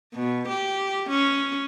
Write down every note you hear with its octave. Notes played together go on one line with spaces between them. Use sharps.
B2
G4
C#4